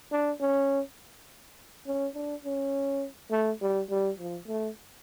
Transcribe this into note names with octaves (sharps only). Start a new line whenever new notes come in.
D4
C#4
C#4
D4
C#4
A3
G3
G3
F3
A3